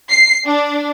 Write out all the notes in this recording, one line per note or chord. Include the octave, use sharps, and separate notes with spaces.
C7
D4